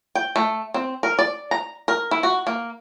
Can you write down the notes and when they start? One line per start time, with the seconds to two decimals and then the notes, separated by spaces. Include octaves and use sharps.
0.15 G5
0.36 A3
0.74 C4
1.03 A#4
1.19 D5
1.51 A#5
1.88 A#4
2.11 E4
2.23 F#4
2.47 A#3